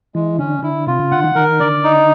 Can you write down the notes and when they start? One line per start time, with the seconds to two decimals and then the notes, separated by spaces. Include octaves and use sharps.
0.15 E3 G#3
0.38 D3 C#4
0.63 D3 E4
0.87 C3 F4
1.00 C#3
1.11 D3 F#5
1.24 D#3
1.35 D#3 A#4
1.60 D3 D5
1.84 D#4